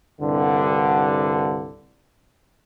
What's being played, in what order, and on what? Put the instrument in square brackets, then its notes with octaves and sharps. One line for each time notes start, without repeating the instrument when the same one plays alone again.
[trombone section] C2 G2 D3